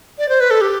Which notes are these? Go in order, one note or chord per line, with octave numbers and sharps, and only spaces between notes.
D5
C5
B4
A4
G4